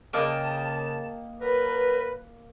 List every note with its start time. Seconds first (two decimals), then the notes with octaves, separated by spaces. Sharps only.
0.13 C#3 A#3 D#5 G5 A5
1.40 F#3 A#4 B4